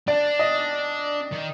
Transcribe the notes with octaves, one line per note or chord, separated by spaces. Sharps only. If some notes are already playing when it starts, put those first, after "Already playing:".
D4 D5
D#5
D#3